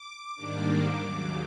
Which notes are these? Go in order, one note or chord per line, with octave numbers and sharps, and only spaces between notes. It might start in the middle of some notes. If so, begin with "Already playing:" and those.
Already playing: D6
G#2 D#3 G3 A#3 D4
D#2 C#3 F#3 D6